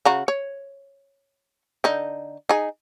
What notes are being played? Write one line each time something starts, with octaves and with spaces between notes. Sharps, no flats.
C#3 F#4 A#5
C#5
D3 D#4
D#4 G#4